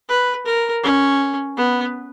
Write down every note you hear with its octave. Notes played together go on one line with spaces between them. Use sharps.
B4
A#4
C#4
B3